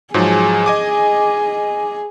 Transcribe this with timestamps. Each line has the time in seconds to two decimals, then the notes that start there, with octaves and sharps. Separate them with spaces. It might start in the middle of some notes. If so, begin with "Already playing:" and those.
0.14 G#2 F3 F#3 G#4
0.66 D#5 G#5 D6